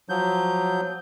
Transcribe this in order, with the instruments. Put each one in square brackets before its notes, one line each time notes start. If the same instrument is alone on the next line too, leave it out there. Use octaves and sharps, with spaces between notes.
[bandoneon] F3 F#3 G6